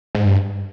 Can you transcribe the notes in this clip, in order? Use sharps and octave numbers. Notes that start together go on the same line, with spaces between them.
G#2
G2